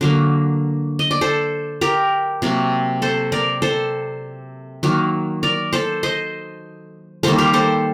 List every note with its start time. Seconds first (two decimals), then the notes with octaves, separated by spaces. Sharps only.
0.01 D3 F#3 A#3
0.99 D#5
1.11 D5
1.21 A4 C5
1.81 G4 A#4
2.42 C3 F#3 A#3
3.02 A4 C5
3.32 A#4 D5
3.62 A4 C5
4.83 D#3 F#3 A#3
5.43 A#4 D5
5.73 A4 C5
6.03 C5 D#5
7.23 D#3 G3 A#3 A4 C5
7.38 G4 A#4
7.53 A4 C5